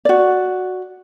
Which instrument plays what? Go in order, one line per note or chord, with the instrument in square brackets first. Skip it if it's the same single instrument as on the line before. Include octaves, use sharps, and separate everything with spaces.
[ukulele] F#4 D5